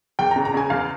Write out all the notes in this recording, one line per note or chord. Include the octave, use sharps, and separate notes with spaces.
E2 G5
C#3 A#5
A#5
C#3 G#5
E2 F5